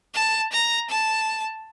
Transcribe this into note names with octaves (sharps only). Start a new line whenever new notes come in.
A5
A#5
A5